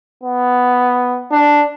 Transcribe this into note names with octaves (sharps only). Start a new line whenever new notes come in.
B3
D4